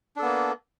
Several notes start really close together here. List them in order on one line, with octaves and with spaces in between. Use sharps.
D4 A4 B3 A#3